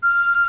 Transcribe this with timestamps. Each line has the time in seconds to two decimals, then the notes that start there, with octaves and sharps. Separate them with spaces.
0.03 F6